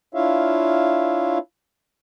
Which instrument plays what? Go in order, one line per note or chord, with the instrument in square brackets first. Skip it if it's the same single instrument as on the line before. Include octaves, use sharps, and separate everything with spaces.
[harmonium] D4 E4 F4 C#5 E5 F5